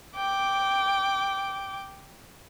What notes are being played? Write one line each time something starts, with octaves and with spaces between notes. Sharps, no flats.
G5 D6